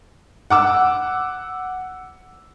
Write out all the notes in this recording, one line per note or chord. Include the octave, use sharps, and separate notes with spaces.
F#5 D6 E6